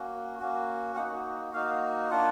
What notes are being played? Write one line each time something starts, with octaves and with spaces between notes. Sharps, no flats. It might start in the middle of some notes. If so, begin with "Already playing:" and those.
Already playing: A#3 C#4 F#4
A#3 C#4 F#4
A#3 D#4 F#4 F#5
A#3 D#4 F#4 F5
A#3 D4 F4 F#5